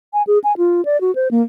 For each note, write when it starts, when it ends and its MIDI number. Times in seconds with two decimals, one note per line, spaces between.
0.13 0.23 80
0.27 0.39 68
0.44 0.56 80
0.57 0.84 65
0.85 1.00 74
1.01 1.14 66
1.15 1.28 72
1.31 1.42 58